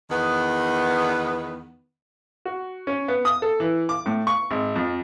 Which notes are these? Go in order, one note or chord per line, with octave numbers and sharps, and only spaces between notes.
E2 D#3 B3
F#4
C#4
B3
D#6
A4
E3
D6
A2
C#6
G#1
F2